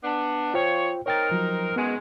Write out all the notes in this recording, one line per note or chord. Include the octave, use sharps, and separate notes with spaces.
B3 D4
F3 F4 C5 C#5 G5
C4 D#4 A#4 C#5 G5 A6
F3 F#3
F#2 D#3 G#3 B3